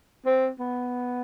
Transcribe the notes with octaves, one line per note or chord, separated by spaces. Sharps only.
C4
B3